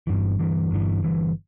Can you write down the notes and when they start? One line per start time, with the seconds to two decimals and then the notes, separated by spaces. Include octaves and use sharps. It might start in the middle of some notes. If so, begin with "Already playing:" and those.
0.07 G1 G2 E3
0.39 G1 G2 E3
0.71 G1 G2 E3
1.03 G1 G2 E3